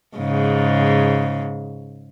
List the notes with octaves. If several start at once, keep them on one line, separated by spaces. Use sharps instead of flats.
G#2 C#3